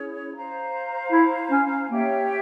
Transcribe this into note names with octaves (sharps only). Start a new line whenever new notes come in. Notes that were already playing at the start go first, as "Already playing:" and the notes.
Already playing: C#4 E4 G#4 C#5
C5 F5 A#5
E4
C#4
A#3 G4 C#5 E5 G5